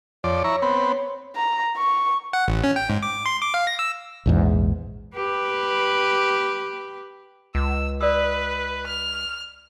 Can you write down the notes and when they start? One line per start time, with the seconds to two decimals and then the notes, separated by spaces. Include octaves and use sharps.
0.24 F2 C#5 D5
0.44 E4 A#5 C#6
0.62 B3 C4
1.36 A#5
1.77 C#6
2.33 F#5
2.48 A1
2.64 C#4
2.76 G5
2.90 G#2
3.03 D6
3.26 C6
3.41 D6
3.54 F5
3.67 A#6
3.79 E6
4.26 A#1 E2 G#2
5.15 G4 B4
7.55 C#2 E6
8.01 B4 D5 D#6 E6
8.87 F6